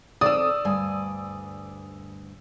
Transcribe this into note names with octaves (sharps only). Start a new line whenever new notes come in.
C4 A4 D5 D#6 E6
D2 G2 G#5